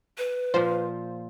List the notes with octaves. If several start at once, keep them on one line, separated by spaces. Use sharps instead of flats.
B4
A#2 F3 C5